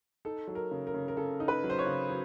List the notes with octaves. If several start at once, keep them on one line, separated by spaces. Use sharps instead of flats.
D#4 A4
F#3
A#4
C#3
A#4
C#3
A#4
C#3 A4
D#4
B4
F#3
C5
C#5
C#3
F#3